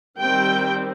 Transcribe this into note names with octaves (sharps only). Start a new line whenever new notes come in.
D#3 G3 C4 G5